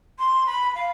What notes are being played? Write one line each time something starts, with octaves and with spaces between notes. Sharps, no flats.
C6
B5
F5